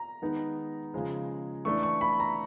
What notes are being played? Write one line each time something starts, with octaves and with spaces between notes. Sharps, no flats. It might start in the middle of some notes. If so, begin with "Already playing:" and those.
Already playing: A#5
D#3 G#3 B3 D#4
C#3 F3 G#3
E3 A3 D4 C#6
C#6
B5
A#5